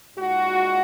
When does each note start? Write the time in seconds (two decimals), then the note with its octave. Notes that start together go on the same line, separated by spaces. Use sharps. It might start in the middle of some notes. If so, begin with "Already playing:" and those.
0.17 A#2 G#3 D#4 F#4